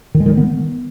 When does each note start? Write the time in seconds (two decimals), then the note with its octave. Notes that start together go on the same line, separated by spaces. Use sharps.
0.15 D#3
0.20 G#3
0.26 D#3
0.32 G3
0.37 B3